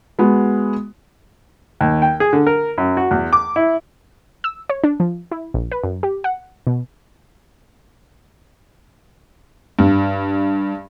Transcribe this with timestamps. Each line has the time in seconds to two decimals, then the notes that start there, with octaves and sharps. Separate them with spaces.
0.19 G#3 B3 F#4
1.81 D#2
2.02 G5
2.20 G#4
2.33 D3
2.47 A#4
2.78 F#2
2.97 F#4
3.11 E2
3.33 D6
3.56 E4
4.44 E6
4.70 C#5
4.84 D4
5.00 F3
5.31 E4
5.54 A#1
5.72 B4
5.84 F#2
6.03 G4
6.24 F#5
6.67 B2
9.79 G2